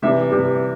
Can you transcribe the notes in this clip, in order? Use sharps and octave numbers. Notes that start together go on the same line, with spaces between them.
C3 E3 G3 E5
C3 E3 G3